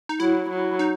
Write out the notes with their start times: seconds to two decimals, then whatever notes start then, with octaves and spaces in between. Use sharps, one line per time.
0.09 D#4
0.20 F#3 E4
0.50 F#3
0.79 D#4